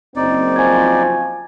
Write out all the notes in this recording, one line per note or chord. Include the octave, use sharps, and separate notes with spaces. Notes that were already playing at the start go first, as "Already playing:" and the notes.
F#1 C4 D#4 D5
F3 G#5 C#6 G#6